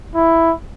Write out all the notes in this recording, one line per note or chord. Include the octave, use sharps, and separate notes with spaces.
E4